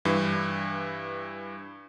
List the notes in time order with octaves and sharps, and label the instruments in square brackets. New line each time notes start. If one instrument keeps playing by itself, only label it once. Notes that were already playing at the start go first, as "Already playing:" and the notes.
[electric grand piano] G2 E3